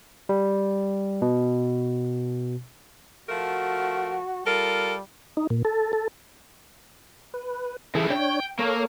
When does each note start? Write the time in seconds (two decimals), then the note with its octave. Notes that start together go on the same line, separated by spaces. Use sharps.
0.29 G3
1.22 B2
3.28 F3 A3 F#4 A#4
4.46 G3 F4 A4 A#4
5.37 D#4
5.50 A#2
5.65 A4
5.93 A4
7.34 B4
7.95 C#3 E3 E4 G#4 A4
8.10 D4 C#5 G5
8.59 A#3 A4 C#5